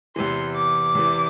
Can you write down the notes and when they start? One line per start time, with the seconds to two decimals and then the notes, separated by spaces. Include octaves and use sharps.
0.16 E2 C3 E3 C6
0.56 D6
0.95 E2 C3 E3